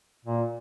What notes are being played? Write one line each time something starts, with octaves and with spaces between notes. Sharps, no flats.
A#2